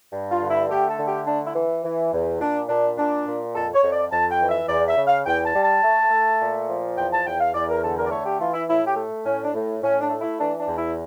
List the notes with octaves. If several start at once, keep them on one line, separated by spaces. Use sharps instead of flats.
G2
F4
D3
E4
A3 G4
A4
D3
G4
A3 D4
E4
E3
E3
E2
A#2 D4
A#2 D4
A#2 D4
A#2
F2 A4
C#5
F2
D5
F2 A5
G5
E3
E5
E2 D5
E5
C#3
F5
E2 G5
A5
G3
A5
A3
A3
A#2
F3
E2 G5
A5
E2 G5
F5
E2 D5
A#4
D3 A4
A#4
D5
A3 C#5
G4
E3 F4
E4
A2 E4
G4
A3
A2 C#4
D4
A2
A2 C#4
D4
A3
E4
E3 D4
D4
E2
E4